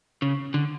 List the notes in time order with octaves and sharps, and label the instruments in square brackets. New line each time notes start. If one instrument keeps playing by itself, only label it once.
[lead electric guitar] C#3
D3